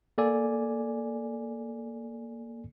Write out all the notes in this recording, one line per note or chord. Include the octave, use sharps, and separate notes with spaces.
A#3 A4 D5 G#5